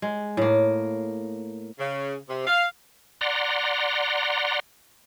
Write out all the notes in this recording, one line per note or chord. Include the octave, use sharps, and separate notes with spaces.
G#3
A2 A#3
C#3
C3
F5
D5 F#5 A#5 C6